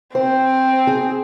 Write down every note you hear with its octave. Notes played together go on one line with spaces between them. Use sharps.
C4 C5
G#4